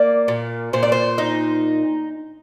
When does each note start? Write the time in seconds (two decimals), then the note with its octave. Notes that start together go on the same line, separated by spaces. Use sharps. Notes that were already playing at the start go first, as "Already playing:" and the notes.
Already playing: A#3 D5
0.28 A#2
0.73 A#2 C5
0.83 D5
0.92 C5
1.18 D#4